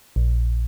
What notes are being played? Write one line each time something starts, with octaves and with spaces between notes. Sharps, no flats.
A#1